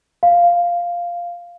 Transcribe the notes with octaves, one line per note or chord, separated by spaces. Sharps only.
F5